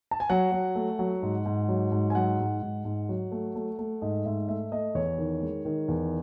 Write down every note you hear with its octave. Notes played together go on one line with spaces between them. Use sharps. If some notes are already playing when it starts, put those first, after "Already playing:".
A5
G#5
F#3 F#5
F#3
A3
F#3
G#2
G#2
F#3
G#2
G#5
F#3 F#5
G#2
G#2
G#2
F#3
A3
A3
A3
G#2 D#5
G#2 E5
A3 E5
A3 D#5
E2 C#5
D#3
G#3
D#3
E2